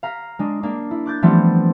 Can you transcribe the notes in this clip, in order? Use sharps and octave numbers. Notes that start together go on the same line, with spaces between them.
F5 A#5 B6
G#3 D4
A#3 D4
E4
D6 F#6 G6 A6
E3 F3 G3 A3 B3 C4